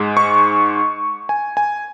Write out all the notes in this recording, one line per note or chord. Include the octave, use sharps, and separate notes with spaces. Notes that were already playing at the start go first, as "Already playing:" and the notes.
Already playing: G#2 G#3
C#6
G#5
G#5